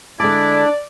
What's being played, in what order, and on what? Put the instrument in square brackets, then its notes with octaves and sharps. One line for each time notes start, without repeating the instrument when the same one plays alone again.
[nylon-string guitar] D3 G#3 A5 [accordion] D4 [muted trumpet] E4 [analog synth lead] D5